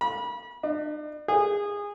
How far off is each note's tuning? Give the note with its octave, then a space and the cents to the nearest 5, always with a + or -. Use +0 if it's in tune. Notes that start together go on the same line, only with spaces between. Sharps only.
B5 -35
D4 +45
G#4 -20